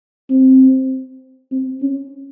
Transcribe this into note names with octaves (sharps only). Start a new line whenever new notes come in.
C4
C4
C#4